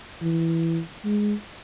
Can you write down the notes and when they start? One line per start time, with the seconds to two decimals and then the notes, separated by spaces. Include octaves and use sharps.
0.22 E3
1.05 G#3